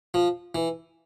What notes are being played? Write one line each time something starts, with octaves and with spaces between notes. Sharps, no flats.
F3
E3